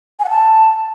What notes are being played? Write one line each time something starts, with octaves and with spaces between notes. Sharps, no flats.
G#5
F#5
A5